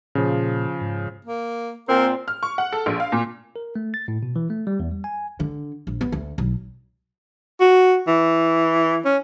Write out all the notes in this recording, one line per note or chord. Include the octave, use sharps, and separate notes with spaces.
A#2 C#3 F3
G#2
A#3
A#2 C4 A#4
F6
C#6
F#5
A4
A#1
F5
A#2
A#4
A3
A6
A2
B2
E3
A3
G3
E2
G3
G#5
D3
A#1
B3
D2
B1
F#4
E3
C#4